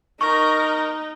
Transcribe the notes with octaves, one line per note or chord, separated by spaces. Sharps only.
D#4 A#4 C#6